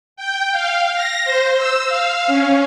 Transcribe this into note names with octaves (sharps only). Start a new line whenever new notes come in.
G5
F5
A#6
C5
E6
F5
C#4